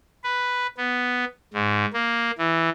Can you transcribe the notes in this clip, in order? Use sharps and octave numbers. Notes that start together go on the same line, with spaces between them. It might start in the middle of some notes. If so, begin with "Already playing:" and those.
B4
B3
G#2
A#3
E3